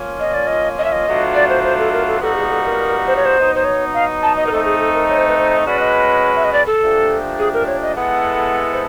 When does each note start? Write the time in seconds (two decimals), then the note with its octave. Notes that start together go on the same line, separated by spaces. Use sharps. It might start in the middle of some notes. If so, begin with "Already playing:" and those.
Already playing: F3 A#3 C#4 F4
0.20 D#5
0.34 D5
0.47 D#5
0.78 D#5
0.84 E5
0.92 D#5
1.07 B2 F#3 A3 D4 F4
1.35 D5
1.49 C5
1.64 C5
1.79 A4
1.93 A#4
2.07 A4
2.21 A#2 G3 B3 D#4 F#4 A4
2.36 G#4
2.50 A4
2.65 A#4
3.07 C5
3.16 C#5
3.25 C5
3.36 F#3 B3 D#4
3.55 C5
3.65 C#5
3.94 F5
4.23 A5
4.37 D#5
4.47 A#4
4.51 A3 C4 D#4 A4
4.65 G#4
4.80 A4
4.94 A#4
5.09 C#5
5.18 C5
5.28 B4
5.38 C5
5.66 G#3 C#4 F#4 B4 D5
5.80 D#5
6.36 E5
6.45 D#5
6.53 D5
6.67 A4
6.81 A#2 F3 A3 D4 G4
7.39 G#4
7.53 A#4
7.67 C#5
7.82 D#5
7.96 G#3 B3 E4 A4 F#5
8.72 C5